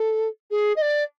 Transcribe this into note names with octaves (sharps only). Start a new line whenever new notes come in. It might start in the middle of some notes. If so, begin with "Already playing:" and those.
Already playing: A4
G#4
D#5
D5